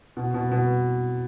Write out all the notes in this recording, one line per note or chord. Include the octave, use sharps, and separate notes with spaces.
B2
B2
B2